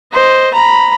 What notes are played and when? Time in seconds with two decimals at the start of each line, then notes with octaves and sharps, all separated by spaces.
0.13 C5 D#5
0.54 A#5 B5